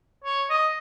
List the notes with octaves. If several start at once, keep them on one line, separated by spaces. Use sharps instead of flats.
C#5
D#5